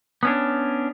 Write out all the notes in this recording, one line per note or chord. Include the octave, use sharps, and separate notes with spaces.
B3 C#4 D4